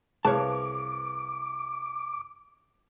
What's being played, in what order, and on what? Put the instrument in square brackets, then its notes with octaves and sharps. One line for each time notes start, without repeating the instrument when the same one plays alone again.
[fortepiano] C2 F#6 [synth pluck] G#4 B4 F5 [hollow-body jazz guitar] C#5 A5 [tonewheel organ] D6